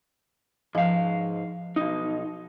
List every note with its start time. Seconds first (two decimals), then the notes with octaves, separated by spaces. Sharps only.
0.75 G#2 F3 D#5 F5
1.76 B1 D#4